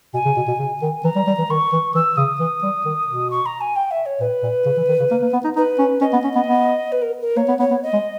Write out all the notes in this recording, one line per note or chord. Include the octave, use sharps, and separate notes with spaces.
B2 G#5
C#3
B2
B2
C#3
D#3
E3 A#5
G3
G3
E3
D#3 C#6
E3
E3 E6
C#3 D#6
E3
G3
D#3
B2
C#6
A#5
G#5
G5
E5
C#5
A#2 B4
A#2
C#3
E3
D#3
C#3
A#3
A#3
B3
D#4
D#4 B4
C#4
C#4 D#5
B3
C#4
B3
B3
B4
A#4
A#4
A#3 C#5
B3
B3 C#5
B3
D#5
G#3